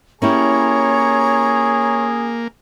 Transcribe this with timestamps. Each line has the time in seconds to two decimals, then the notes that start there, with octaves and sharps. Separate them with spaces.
0.22 A#3 C#4 E4 G4 G#4 C#5 A#5 C#6